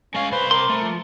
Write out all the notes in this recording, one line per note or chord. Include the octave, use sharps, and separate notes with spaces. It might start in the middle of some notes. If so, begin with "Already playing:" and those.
G#3 C#4 F5
C2 B4 C5
A#4 C6 D6
A3
F3